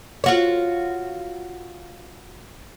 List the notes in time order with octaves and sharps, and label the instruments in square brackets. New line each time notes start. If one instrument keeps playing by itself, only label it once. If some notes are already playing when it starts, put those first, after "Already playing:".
[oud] F4 F#4 C#5